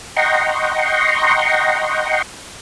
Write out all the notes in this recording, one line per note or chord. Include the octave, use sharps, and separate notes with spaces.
D#5 F#5 G5 A#5 C6 C#6